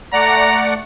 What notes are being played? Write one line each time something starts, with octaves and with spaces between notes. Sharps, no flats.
A3 D5 F#5 A#5